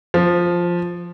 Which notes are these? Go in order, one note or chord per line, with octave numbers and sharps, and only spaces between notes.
F3